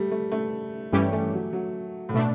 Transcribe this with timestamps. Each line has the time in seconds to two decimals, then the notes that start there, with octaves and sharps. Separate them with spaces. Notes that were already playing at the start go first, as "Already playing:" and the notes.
Already playing: G3 A3
0.11 A3
0.31 A3
0.92 G2 E3 G3 A3 C#4 G4
1.12 A3
1.33 F#3
1.53 F#3
2.09 A2
2.14 B2 A3 D4